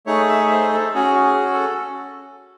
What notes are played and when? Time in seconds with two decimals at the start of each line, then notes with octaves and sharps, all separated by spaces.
0.06 A3 D#4 G#4 C#5
0.29 E5
0.51 C5
0.73 A4
0.94 C#4 F#4 G#4
1.24 G#4
1.53 A4